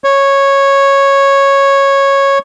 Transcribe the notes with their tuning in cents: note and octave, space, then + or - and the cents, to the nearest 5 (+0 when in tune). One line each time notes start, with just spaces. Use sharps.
C#5 -10